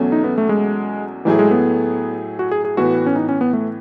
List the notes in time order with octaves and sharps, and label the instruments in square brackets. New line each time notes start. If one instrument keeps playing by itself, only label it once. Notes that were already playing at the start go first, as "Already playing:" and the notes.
Already playing: [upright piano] E2 B2 F#3 A3 C#4
[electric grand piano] D#4
B3
A3
G#3
[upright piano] A2 F#3 A3 E4 G#4 [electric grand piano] E3
[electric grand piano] G#3
B3
F#4
G#4
G#4
[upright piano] A2 E3 B3 [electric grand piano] F#4
[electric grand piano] C#4
D#4
C#4
B3
A3